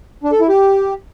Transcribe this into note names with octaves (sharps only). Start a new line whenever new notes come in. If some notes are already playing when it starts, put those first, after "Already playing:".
D4
A4
E4
G4